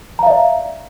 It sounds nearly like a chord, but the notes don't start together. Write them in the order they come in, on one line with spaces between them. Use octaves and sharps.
A#5 F5 E5 D5